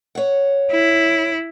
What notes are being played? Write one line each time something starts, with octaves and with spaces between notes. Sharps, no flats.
C#5 F#5
E4